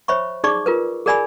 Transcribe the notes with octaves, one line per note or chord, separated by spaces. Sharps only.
C5 C#5 E5 B5 C#6
D#4 G#4 D5 C#6 D6
F4 A#4 B4
G#4 A#4 D5 G#5 B5 E6